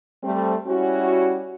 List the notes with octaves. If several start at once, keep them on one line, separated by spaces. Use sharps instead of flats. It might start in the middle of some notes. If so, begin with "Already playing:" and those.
G3 A3 C4
G3 C#4 E4 F#4